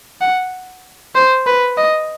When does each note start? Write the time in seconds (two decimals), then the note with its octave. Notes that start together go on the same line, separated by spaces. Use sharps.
0.21 F#5
1.15 C5
1.47 B4
1.78 D#5